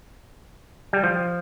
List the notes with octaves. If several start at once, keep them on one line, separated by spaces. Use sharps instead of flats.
G3
F3